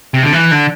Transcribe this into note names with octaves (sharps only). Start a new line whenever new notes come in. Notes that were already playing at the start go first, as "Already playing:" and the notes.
C3
D3
E3
D3